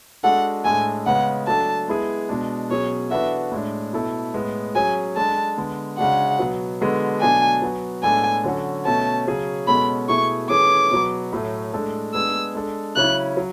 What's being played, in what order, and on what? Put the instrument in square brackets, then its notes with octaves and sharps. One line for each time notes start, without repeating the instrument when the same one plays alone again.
[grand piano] G#3 D4 F#4 A4 [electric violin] F#5
[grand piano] A2 G#3 D4 A4 [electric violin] G#5
[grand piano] C#3 G#3 B3 [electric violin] F#5
[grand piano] F#3 A3 D4 A4 [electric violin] A5
[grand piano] G#3 B3 E4 G#4
B2 G#3 D4
[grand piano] B2 F#3 C#4 G#4 [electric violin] C#5
[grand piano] E3 B3 D4 F#4 A4 [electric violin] E5
[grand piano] A2 G#3 D4
B2 A3 E4 A4
A2 G#3 B3
[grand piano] F#3 C#4 G#4 [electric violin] G#5
[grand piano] G#3 D4 A4 [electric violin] A5
[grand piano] D3 G#3 B3
[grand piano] C#3 G#3 D4 F#4 [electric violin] F#5
[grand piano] B2 F#3 B3
D3 G#3 B3 F#4 A4
[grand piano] B2 F#3 A3 D4 [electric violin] G#5
[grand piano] F#3 B3 F#4
[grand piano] A2 G#3 B3 D4 A4 [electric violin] G#5
[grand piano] D3 F#3 C#4 F#4 A4
[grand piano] B2 A3 C#4 [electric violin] A5
[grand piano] C#3 F#3 C#4 G#4
[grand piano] B2 G#3 C#4 F#4 A4 [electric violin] B5
[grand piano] B2 A3 E4 G#4 [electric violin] C#6
[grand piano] E3 A3 C#4 G#4 [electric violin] D6
[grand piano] B2 F#3 B3
A2 F#3 A3
A2 G#3 D4 A4
[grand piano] G#3 B3 D4 G#4 [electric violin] E6
[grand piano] G#3 D4 A4
[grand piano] C#3 F#3 C#4 E4 [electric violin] F#6
[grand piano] F#3